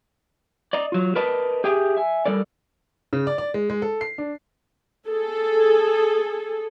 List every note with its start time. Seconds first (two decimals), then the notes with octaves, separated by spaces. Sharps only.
0.73 D5 D#5 A#5
0.92 F#3 F4
1.16 A#4 B4 D5 D#5 A5
1.64 G4 G#4 E5 G5 G#5
1.97 E5 G#5
2.26 G3 A4 A#4 D5
3.13 C#3
3.27 D5
3.38 D5
3.54 G#3
3.70 G#3
3.82 A4
4.01 C7
4.18 D4
5.07 G#4 A4